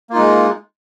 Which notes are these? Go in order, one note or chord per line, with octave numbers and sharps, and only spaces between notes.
G#3 A#3 D#4 F4